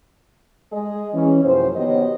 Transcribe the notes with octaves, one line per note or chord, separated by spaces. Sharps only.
G#3 G#4 D#5
E3 C#4
F#2 C3 F3 A#3 C5
D#3 B3 F#4 G4 C#5 D#5